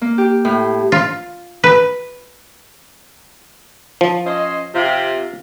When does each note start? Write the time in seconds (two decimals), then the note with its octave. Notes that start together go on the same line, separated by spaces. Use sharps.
0.01 A#3
0.18 G4
0.45 A2
0.92 F4
1.64 B4
4.01 F3
4.26 C#4 C5 D#5
4.75 C3 F4